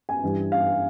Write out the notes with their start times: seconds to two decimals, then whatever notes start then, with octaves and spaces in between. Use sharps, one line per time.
0.09 G#5
0.23 G2 E3 G3
0.52 F5